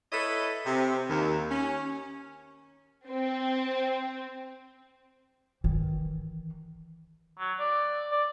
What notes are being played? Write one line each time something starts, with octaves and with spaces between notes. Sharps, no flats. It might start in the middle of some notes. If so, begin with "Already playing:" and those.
E4 A4 B4 C#5 D#5 E5
C3
D#2
C#4
C4
D#3 E3
F#3
D5
D5